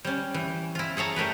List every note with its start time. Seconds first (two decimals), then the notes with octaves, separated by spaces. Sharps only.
0.05 G3 C#4
0.34 E3
0.75 E4 F4
0.97 G#4 A4 C#5 A#5
1.16 G3 A3 A#4 B4